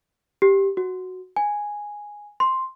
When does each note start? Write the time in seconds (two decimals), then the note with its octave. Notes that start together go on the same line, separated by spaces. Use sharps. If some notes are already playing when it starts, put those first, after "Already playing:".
0.42 G4
0.77 F#4
1.36 G#5
2.40 C6